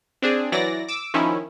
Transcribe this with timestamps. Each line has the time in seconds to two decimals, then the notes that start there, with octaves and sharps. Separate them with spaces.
0.22 C4 D4 G#4
0.52 E3 F#3 D5 A#6
0.88 D6 E6
1.14 D#3 F3 C#4 E4